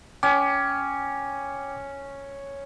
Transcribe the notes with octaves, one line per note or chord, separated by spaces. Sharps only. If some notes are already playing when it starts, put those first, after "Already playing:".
C#4 G5 D6